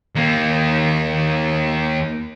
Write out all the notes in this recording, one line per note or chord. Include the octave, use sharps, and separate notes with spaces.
D#2 A#3